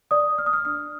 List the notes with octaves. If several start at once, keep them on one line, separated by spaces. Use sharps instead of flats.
D5 D#6
D5 F6
D#6
F6
D4 F6